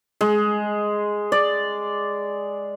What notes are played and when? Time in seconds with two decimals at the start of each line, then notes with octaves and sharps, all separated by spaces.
0.21 G#3
1.32 D5